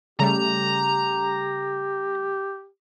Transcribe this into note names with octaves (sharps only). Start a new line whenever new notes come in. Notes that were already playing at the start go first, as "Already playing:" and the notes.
C#3 G3 A3 G4 A#5